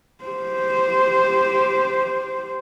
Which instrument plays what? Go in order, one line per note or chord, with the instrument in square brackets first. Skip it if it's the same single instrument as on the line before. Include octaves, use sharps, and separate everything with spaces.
[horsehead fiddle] G4 C5